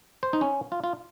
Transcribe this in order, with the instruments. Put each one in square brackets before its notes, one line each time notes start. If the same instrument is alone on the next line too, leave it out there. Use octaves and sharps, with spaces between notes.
[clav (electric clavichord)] C5
D#4
C#4
F4
F4